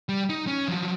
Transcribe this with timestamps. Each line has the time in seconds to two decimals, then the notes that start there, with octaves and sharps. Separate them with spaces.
0.09 G3
0.29 D#4
0.47 C#4
0.68 F3 F#3